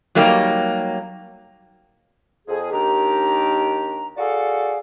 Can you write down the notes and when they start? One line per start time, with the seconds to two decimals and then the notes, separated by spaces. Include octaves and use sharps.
0.15 F#3 G3 A#3 D#4 G4
2.48 F2 G#4
2.72 D#2 D#3 D4 G4 A#5
4.17 F#4 G#4 A4 D5 F5